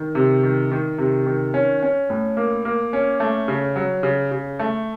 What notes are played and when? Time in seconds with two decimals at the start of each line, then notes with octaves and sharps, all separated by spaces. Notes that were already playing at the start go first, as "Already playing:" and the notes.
Already playing: D#3
0.15 C3
0.43 D#3
0.71 D#3
0.98 C3
1.26 D#3
1.54 C#4
1.82 C#4
2.10 A2
2.37 A#3
2.65 A#3
2.93 C#4
3.20 A3
3.48 C#3
3.76 F#3
4.03 C#3
4.31 C#3
4.59 A3